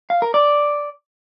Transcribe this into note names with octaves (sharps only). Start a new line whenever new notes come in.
F5
A#4
D5